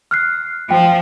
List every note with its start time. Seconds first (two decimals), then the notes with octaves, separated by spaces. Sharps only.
0.11 F6 F#6 C7
0.71 F3 G5